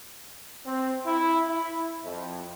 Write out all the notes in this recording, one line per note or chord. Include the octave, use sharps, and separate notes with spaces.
C4
E4
E4
F2